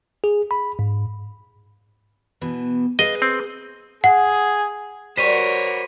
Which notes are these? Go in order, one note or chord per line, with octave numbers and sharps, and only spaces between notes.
G#4
B5
G#2
B2 E3
G#4 B4 D#5 F5
C4
G#4 F#5
G3 F#4 A#4 C5 C#5 F#5 B6 D#7